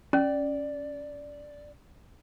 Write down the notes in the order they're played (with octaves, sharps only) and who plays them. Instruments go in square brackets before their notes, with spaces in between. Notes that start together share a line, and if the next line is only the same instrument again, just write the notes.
[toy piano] C#4 [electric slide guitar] D5